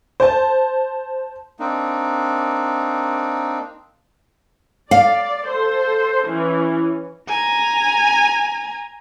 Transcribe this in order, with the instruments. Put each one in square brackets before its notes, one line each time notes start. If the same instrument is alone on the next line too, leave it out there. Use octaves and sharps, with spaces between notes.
[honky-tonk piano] C5 A5
[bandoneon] A#3 C4 D4 D#4
[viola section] D5 [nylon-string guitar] F5
[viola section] A4 C5
E3 C#4
[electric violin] G#5 A#5